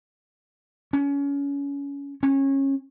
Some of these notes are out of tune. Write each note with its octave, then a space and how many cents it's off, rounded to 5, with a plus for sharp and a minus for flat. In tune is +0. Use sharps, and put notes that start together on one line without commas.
C#4 +25
C#4 -25